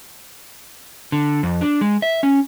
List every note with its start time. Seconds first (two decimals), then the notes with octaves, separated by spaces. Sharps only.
1.12 D3
1.43 F2
1.61 D4
1.81 G#3
2.02 E5
2.23 C#4